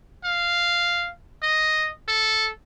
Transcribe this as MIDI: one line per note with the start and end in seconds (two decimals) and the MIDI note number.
0.25 1.10 77
1.43 1.90 75
2.08 2.49 69